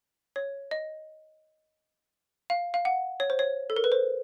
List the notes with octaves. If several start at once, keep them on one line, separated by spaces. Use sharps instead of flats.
C#5
D#5
F5
F5
F#5
C#5
C5
C#5
A4
A#4
B4
C5